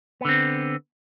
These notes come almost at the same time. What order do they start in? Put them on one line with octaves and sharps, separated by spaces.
B3 D3 C4